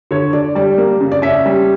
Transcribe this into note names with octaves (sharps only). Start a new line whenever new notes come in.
D3 C#5
D3 D5
G3 D5
A#3
C#3
D5
C#4 E5
G3